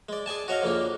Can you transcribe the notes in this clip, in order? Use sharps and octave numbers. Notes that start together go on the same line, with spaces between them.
G#3 D5
G#4 D5 G#5 A5
F#4 C#5 D#5 F5
F2 C#3 A#3 D4